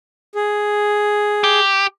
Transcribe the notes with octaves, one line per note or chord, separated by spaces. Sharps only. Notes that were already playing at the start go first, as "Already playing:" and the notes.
G#4
G4